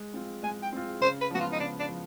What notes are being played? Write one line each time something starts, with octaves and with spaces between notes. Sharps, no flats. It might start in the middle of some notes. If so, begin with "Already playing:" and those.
Already playing: G#3
C4 F4
G#3 G#5
G5
C4 F4
C#3 C5
B4
F3 G#3 B3 F#4
F4
D#4
C#3 D4
D4
F3